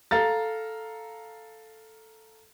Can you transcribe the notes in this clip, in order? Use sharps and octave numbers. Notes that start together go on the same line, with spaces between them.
A4 F5 A#5 A6